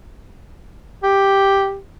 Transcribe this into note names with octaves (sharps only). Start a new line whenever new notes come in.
G4